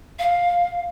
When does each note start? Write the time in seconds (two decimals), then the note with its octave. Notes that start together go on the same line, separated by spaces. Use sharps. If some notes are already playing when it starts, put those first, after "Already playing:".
0.19 F5